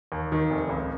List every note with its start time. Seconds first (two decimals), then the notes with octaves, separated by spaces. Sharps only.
0.12 D#2
0.32 D#3
0.51 F1
0.69 C#2